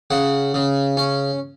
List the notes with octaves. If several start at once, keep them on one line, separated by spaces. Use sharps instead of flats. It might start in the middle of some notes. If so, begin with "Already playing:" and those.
C#3 F#5
C#3
C#4